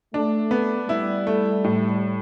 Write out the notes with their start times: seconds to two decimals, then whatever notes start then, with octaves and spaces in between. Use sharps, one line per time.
0.14 A3 D4
0.51 B3
0.89 G3 E4
1.27 A3
1.64 A2